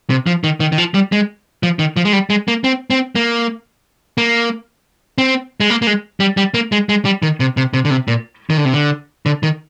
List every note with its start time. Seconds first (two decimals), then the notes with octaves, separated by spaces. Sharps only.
0.10 C3
0.27 F3
0.44 D#3
0.60 D#3
0.72 D#3
0.78 F3
0.94 G3
1.12 G#3
1.63 F3
1.79 D#3
1.96 F3
2.05 G#3
2.13 G3
2.30 G#3
2.48 A#3
2.64 C4
2.90 C4
3.15 A#3
4.18 A#3
5.18 C4
5.60 G#3
5.70 A#3
5.82 A#3
5.87 G#3
6.20 G3
6.37 G3
6.54 A#3
6.72 G#3
6.89 G#3
7.05 G3
7.22 D#3
7.40 C3
7.57 C3
7.74 C3
7.85 D3
7.90 C3
8.08 A#2
8.50 D#3
8.57 D3
8.65 C3
8.74 D3
9.26 D3
9.43 D#3